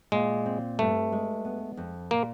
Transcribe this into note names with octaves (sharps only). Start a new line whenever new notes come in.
A#2 G#3
C4
G2 A3
G#3
B3
F2
A#2 A#3